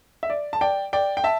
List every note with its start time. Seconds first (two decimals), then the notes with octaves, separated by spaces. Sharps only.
0.23 E5
0.30 D5
0.53 A5
0.61 D5 G5
0.93 D5 G5
1.17 G5
1.24 E5 A5